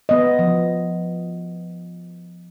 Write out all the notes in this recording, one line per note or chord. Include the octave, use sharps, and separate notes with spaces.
B3 D#5
F3